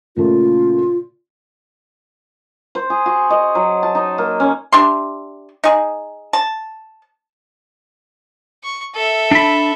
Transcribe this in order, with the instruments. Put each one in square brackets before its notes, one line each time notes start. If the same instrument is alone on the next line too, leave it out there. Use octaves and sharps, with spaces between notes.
[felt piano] A#2 C#3 A3 [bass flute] F4
[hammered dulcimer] C5
G#4
F#4
D#5
F#3
A5
D#4
A#3
C#4
[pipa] D4 G4 E5 C6
D#4 G#4
A5
[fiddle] C#6
A4 E5
[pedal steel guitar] D4 B5